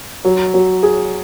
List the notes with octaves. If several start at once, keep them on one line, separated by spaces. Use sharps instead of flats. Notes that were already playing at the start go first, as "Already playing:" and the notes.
F#3
F#3
G#4